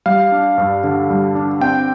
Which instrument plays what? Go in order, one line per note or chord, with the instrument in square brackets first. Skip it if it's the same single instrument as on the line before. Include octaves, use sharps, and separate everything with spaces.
[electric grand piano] G3 F5
D4
G2
D3
G3
D4
C4 G5